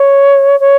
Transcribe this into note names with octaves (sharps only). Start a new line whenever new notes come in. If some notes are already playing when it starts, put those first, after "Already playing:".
Already playing: C#5
C#5